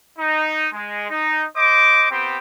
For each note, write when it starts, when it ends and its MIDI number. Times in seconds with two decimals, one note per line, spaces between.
0.18 0.67 63
0.74 1.07 56
1.10 1.45 63
1.56 2.06 72
1.56 2.06 75
1.56 2.06 86
2.10 2.38 59
2.10 2.38 60
2.10 2.38 67
2.10 2.38 72
2.10 2.38 79